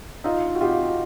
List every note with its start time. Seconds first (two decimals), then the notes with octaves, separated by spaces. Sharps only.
0.24 D#4 F4
0.55 F#4
0.61 F4 G4